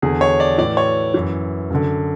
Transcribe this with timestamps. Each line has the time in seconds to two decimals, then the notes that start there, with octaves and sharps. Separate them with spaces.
0.02 E2 D3 G#4
0.21 C#5
0.40 D5
0.58 A2 E3 D5
0.77 C#5
1.14 F#2 E3
1.70 F#2 D3